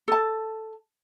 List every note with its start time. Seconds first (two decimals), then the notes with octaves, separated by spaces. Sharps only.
0.08 A4 A5